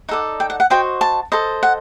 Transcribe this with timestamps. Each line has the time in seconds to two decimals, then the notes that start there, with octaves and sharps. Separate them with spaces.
0.09 D#4 A4 D5 F#5
0.40 G5
0.50 F#5
0.60 F#5
0.70 F#4 C5 D#5 G5
1.01 A5
1.32 A4 C5 D#5
1.63 F#5